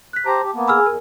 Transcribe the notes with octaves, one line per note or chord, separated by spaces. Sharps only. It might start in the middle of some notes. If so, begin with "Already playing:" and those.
F#6 B6
G4 C5 A5 A#5
G4
A#3 B3
G#4 G#5 B5 E6 F6
E2 A#4